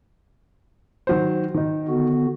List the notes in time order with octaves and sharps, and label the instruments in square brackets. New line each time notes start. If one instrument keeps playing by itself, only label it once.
[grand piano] D#3 F#3 C5
D#3 D#4
[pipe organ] D3 B3 F#4